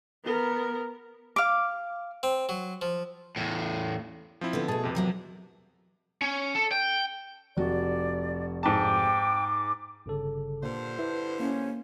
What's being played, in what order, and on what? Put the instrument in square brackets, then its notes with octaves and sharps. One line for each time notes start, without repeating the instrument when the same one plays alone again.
[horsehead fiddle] B3 A#4
[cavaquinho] F5 D6
[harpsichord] C4
F#3
F3
[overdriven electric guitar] E2 A2
[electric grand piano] F3 C4 E4
[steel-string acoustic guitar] D3 B3
[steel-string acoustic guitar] B2 A3 [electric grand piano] G#4 A5
[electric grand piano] F2 C3
[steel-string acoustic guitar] E2 F#3 A#4
[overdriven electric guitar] C#4
A4
G5
[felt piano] F1 F#4 [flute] D5
[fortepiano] G#2 A5 [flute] G5 [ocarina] D6
[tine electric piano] G1 C#3 A4
[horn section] G2 D3 C5 [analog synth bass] A#2
[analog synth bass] E4 [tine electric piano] B4
[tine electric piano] A#3 [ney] C#4